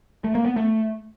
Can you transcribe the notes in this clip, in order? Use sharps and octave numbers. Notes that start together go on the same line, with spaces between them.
A3
A#3
B3
A3